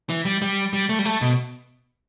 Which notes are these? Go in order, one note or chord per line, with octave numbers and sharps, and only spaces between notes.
E3
G3
G3
G3
A3
G3
A3
B2